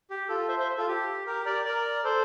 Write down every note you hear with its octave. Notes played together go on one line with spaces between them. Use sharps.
G4
F4 A4
C5 E5
C5 E5
F4 A4
G4
G4 A#4
A#4 D5
A#4 D5
A4 C5